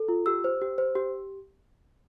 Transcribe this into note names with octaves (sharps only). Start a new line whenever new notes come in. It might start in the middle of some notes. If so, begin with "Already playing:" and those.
Already playing: A4
F4
G4 E6
C5
G4
C5
G4